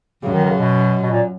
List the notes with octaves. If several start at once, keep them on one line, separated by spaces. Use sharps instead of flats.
F#2 C#3
D#3
D#3
C#3
B2
B2
A#2